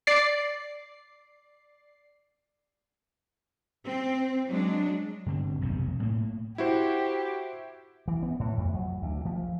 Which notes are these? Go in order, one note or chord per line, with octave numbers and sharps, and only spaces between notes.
D5 C7
C4
F#3 G#3 D4
G2 D3 C4
F1 B1 F2 C3
A2 A#3
E4 F#4 G4 C5
E3
B3
A2
F2
F#3
D2
F3